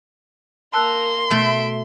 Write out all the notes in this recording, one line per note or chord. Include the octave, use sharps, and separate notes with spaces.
A#3 A#4 A5 C6 E6 F#6
B2 A3 E5 D7